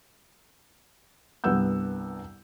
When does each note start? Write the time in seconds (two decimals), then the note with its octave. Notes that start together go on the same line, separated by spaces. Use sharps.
1.44 C2 G2 B3 F#5 E6 G6